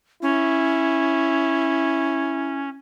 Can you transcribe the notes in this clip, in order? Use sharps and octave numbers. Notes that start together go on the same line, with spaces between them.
C#4 E4